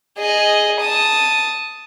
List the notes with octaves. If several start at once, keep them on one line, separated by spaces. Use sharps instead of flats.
G#4 D#5
A5 D#6